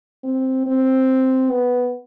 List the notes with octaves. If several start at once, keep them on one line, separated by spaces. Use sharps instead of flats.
C4
C4
B3